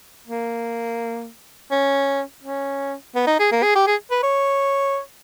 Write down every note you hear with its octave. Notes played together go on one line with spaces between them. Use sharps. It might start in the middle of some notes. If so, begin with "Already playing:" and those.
A#3
C#4
C#4
B3
D#4
G#4
A#3
G#4
G4
G#4
B4
C#5